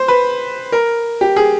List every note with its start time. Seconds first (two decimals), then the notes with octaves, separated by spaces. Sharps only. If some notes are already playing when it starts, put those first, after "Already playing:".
Already playing: C5
0.08 B4
0.72 A#4
1.21 G4
1.36 G#4